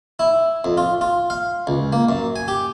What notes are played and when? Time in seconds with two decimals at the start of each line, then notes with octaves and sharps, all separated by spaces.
0.19 E4
0.64 F2
0.77 F4
1.01 F4
1.30 F5
1.67 C#2
1.93 A#3
2.09 F#2
2.36 G#5
2.48 G4